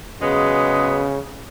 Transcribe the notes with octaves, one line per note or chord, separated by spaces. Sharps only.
C#3 F#3 G#3 B3